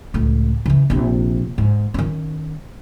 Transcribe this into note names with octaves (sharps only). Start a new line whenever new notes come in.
C#2 A2
C#3 E3
A#1 C3
G#2
D#3 C#4